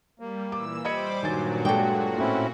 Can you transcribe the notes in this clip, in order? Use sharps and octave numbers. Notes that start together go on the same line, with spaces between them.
G3 A#3
A#2 E3 D6 E6
G3 C5 D#5 B5 D6 G#6 C#7
G2 A#2 D#3 F#3 F#4 G#5 A6
G#3 D4 G4 A4 G5
A2 C4 C#4 E4